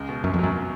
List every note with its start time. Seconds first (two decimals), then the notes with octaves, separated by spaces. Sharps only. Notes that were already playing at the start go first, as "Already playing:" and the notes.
Already playing: C#2 G#3
0.09 B2
0.23 F#2 C#4
0.34 F2
0.39 F#2 F#3